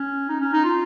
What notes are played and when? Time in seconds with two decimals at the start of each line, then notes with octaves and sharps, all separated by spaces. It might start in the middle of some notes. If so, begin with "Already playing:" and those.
Already playing: C#4
0.29 D#4
0.41 C#4
0.53 D#4
0.65 F4